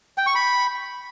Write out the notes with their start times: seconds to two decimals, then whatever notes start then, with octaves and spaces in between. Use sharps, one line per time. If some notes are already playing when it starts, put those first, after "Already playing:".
0.18 G5
0.27 C#6
0.35 B5